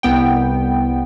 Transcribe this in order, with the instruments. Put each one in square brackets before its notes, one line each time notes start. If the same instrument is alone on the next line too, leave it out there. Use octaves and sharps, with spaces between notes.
[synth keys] C2 B3 G5